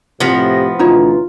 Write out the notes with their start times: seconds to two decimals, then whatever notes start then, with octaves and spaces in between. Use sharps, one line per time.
0.20 A2 C3 F3 B3 A#6
0.79 D2 B2 E3 D#4 F4 C#5